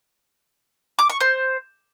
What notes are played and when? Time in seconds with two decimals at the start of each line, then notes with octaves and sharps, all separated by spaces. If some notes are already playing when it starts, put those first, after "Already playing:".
0.99 D6
1.10 C#6
1.20 C5